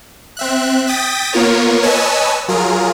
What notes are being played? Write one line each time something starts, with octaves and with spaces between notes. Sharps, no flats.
C4 E5 F#6
G5 D#6 A6 B6
A#3 B3 F4 A#4 C#5
B4 C#5 D#5 G#5 A5 E6
F#3 F4 G#4 A#4